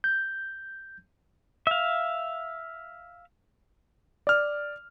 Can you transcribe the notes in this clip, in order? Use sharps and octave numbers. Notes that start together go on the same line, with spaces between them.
G6
E5 F5
D5 F6